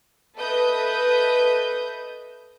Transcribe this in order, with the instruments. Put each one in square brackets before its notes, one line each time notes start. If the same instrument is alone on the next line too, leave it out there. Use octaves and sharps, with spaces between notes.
[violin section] A4 B4 D#5 E5 D#6 G6